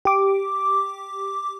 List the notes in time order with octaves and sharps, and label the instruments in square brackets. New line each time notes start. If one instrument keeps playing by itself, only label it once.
[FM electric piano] G4 D6